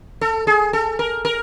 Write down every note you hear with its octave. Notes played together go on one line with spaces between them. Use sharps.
A4
G#4
A4
A#4
A#4